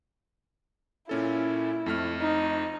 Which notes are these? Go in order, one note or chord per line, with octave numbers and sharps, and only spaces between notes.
A#2 C#4 E4 A4
F2 A3 F6
D#4